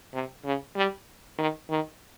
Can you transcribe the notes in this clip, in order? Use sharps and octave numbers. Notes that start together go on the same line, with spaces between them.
C3
C#3
G3
D#3
D#3